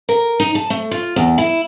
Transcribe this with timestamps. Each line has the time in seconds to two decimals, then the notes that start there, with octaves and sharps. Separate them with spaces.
0.09 A#4
0.40 D#4
0.55 A5
0.70 A3
0.91 F4
1.16 E2
1.38 E4